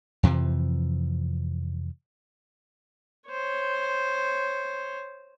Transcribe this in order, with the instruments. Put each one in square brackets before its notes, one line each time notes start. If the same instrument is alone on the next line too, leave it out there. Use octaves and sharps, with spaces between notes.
[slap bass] F2 C3 E3 F3
[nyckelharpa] C5 C#5